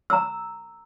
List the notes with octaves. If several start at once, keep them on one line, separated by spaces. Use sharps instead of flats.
A#5 E6